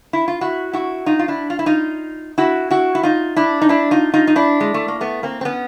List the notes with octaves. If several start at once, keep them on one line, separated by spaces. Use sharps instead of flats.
E4
F4
E4 F#4
E4 F#4
D#4 F4
F4
D4 E4
F4
E4
D#4 F4
E4 F#4
E4 F#4
E4
D#4 F4
D4 E4
D#4
D4 E4
D#4 F4
D#4 F4
D#4
D4 E4
G#3
A3
A#3
A3 B3
A#3 C4
C4
B3 C#4